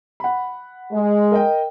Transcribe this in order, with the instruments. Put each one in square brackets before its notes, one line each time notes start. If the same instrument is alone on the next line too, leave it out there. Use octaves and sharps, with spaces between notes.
[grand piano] F#5 B5
[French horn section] G#3
[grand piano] A#4 D#5 G5